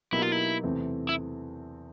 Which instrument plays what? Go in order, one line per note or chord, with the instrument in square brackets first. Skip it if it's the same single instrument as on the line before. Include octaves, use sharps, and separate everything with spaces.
[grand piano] B2 F#3 A#3 D#4 G4 [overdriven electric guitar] E4
[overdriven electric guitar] F4
E4
[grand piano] E2 C3 E3 A3 C4
[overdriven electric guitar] E4